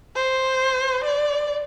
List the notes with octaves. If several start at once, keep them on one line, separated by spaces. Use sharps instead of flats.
C5
D5